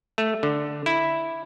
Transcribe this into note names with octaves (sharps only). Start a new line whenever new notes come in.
A3
D3
E4